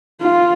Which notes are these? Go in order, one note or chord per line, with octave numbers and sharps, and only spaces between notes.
F4